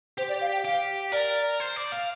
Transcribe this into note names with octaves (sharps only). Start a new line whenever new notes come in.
G4 C5
D5
F5
G5
G4 F5
A#4 D5
C5
D5
F5